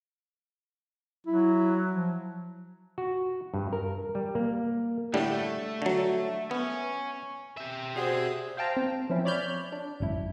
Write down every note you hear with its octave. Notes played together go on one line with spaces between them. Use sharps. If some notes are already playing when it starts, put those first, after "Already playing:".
F#3 E4
F3
F#4
G2
A#4
G3
A#3
A2 D3 G3 A3
D3 F#3
B3 C#4
G4 E5
F#4 G#4 C5 D5 F#5 G#5
C5 F5 G5 A5 A#5
C4
F3 C4 C#4 E4
C#5 D5 B5 F6 G6
D4
G#1 C#2 F#2 E4